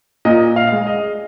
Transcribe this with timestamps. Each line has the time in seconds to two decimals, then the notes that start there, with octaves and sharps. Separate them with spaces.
0.25 A#2 D#5
0.56 F5
0.72 G#3
0.87 D#5